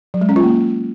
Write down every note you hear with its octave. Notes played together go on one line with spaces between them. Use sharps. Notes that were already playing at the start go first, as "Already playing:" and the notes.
F#3
G#3
C#4
F4
A#3